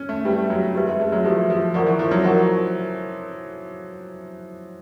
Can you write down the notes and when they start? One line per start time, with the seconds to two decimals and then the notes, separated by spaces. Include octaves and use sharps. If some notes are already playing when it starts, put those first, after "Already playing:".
Already playing: C#4
0.09 A3
0.25 G3 E4 G4 B4 E5
0.50 F#3
0.75 E4 G4 B4 E5
0.87 G#3
1.00 A3
1.12 F#3
1.24 F3 E4 G4 B4 E5
1.50 F3
1.74 F3 A#4 D5 F#5 A#5 C#6
1.87 E3
1.99 F3
2.11 F#3
2.24 F3 A#4 D5 F#5 A#5 C#6